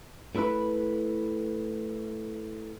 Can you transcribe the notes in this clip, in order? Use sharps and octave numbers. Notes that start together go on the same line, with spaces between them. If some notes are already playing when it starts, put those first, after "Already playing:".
A2 E4 A4 B4 B5